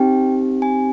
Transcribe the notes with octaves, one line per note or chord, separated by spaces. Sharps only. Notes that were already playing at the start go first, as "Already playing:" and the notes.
Already playing: C4 D#4 G4 G5
G#5